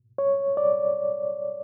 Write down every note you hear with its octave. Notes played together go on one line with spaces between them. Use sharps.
C#5
D5